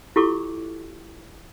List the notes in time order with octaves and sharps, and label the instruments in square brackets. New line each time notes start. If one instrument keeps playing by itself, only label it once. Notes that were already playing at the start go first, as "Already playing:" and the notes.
[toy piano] E4 F4 G4 A4 C#6 D6